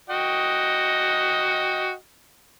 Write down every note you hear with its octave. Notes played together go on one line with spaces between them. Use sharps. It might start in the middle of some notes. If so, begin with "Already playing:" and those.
F#4 D#5 G5